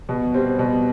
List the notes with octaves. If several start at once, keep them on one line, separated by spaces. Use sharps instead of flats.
B2
G3 C4
B2